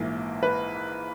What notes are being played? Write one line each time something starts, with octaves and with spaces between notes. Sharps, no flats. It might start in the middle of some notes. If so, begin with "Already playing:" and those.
Already playing: A#1 G#2 E3 A#3
B4